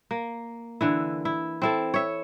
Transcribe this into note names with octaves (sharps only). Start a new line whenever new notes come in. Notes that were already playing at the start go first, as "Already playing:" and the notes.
A#3
D3 E3 E4
E4
C4 E4 A4
C#5 E5